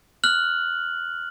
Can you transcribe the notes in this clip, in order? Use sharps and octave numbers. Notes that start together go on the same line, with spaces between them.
F6 F#6 F#7